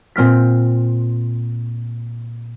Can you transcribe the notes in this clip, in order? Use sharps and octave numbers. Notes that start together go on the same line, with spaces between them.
A#2 C4 F6 B6